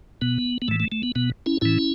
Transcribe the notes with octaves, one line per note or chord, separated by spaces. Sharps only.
B2 B3
B3
A2 E3 A3
A3
A3
B3
B2 B3
C#4 E4
A2 E3 C#4 E4